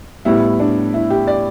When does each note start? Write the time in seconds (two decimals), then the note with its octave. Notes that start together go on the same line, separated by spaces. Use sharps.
0.25 A2 G3 B3 E4
0.60 D4
0.94 E4
1.10 G4
1.27 D5